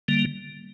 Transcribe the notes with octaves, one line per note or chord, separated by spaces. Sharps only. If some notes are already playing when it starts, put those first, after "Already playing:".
D3 G3 A#3